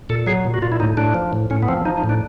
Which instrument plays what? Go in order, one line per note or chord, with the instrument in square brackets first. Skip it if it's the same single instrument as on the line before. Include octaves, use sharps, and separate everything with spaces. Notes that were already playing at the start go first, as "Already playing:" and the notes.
[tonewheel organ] A#2 A4
F#3 G#4
A#2
F#4
A#2 F4
E4
A2 D#4
A2 D4
F3
A2
A2 C#4
B3
F3 C4
F3 D#4
D#4
A2
D4